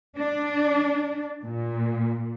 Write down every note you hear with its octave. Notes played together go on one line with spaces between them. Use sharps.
D4
A#2